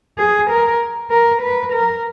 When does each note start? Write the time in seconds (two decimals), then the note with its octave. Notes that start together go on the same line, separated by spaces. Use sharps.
0.18 G#4
0.50 A#4
1.11 A#4
1.42 B4
1.73 A#4